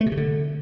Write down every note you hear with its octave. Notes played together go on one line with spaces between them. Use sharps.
A3
C3
C#3
D3